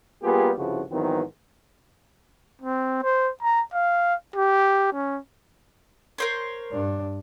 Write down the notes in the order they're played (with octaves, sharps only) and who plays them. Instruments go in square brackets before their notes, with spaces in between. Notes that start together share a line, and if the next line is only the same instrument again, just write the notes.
[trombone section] G3 A#3 B3 F4 G4 G#4
C2 G2 C#3 F3 E4 F#4
G#2 D#3 E3 F#3 B3 C4
[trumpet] C4
C5
A#5
F5
G4
C#4
[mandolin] A#4 C5 C#5
[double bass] G2 D4